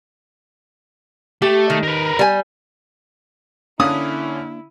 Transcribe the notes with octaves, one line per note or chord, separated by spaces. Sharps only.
A3 G4
D#3
A#4 B4
G3 G#5
D3 A#3 C#4 D4 E4 A5 D#6